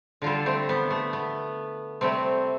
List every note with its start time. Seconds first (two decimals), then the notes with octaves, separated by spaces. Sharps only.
0.22 D3 G3 F4 A4
0.46 A3 C4
0.69 B3
0.91 A3
1.13 B3
2.01 C3 G3 A3 C4